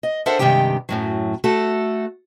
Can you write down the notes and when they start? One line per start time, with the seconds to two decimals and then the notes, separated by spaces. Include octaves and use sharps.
0.03 D#5
0.26 D4 A4 A#4 C5 E5 F#5
0.39 G2 C3 D#3 G#3 G4 G5
0.89 F#2 A2 F#3
1.44 A3 F#4 A4